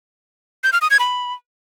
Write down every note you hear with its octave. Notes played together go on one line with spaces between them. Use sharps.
G6
F6
D#6
G#6
B5